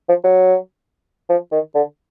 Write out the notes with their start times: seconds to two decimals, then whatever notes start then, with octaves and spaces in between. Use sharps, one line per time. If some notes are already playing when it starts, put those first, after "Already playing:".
0.09 F3
0.24 F#3
1.29 F3
1.52 D#3
1.75 D3